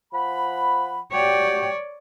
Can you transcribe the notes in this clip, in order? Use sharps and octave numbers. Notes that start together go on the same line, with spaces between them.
F3 F#5 B5
F#4 G4 C#5 D5 G5